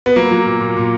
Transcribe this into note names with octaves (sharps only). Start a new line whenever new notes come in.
B3
F#3 A#3
F#3
A#2
A#2
A#2